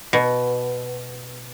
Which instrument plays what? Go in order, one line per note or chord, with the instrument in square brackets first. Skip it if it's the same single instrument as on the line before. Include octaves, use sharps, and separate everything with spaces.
[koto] B2